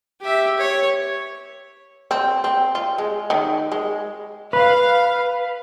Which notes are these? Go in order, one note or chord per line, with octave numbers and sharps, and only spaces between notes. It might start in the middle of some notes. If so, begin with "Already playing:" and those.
G4 E5
C#5
C4
C4
F4
G#3
D#3
G#3
B4 F5